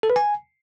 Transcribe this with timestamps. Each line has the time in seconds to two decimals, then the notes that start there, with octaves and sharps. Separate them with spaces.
0.03 A4
0.10 B4
0.16 G#5